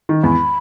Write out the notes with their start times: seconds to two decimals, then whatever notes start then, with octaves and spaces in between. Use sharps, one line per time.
0.09 D#3
0.23 E2 B5